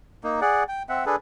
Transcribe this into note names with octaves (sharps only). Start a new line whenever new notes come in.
A#3 D#4
G#4 D5 F#5
G5
C4 E5 F#5
D4 G#4 A4 B4